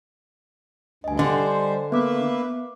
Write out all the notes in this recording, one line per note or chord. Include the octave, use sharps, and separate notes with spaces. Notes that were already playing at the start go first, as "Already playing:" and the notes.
D2 G2 D#5 G#5
D3 G3 C5
A#3 B3 B4 E5 D6